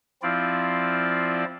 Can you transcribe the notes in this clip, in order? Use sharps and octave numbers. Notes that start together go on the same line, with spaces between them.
F3 C4 E4 F4 D5